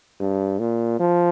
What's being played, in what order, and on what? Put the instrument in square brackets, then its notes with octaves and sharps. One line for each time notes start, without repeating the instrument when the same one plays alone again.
[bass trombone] G2
A#2
F3